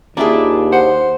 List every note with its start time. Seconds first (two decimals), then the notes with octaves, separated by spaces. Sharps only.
0.17 D#2 D4 E4 F4 G#4 A#4
0.72 C5 F#5